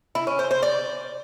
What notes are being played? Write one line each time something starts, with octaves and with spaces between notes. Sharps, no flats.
E4
C#4
C5
C5
D5